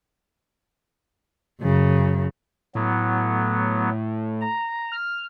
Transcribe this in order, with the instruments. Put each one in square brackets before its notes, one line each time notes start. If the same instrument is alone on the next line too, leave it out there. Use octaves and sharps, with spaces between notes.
[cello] F#2 C#3
[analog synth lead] A2 [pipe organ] F#3 B3
[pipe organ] A#5
[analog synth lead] F6